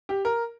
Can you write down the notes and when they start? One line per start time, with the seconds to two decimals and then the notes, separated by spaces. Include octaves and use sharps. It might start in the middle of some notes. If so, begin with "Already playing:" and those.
0.09 G4
0.25 A#4